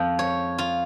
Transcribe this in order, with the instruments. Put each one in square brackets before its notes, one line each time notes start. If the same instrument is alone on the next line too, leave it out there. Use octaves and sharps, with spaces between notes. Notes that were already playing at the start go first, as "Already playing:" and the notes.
Already playing: [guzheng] F2 F3
C#5
F4